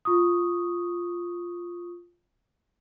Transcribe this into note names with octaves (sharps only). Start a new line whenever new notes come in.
F4 C#6 D#6